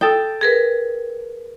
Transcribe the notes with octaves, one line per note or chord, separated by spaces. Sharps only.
A4 G5 D#6
G#4 A#4 B4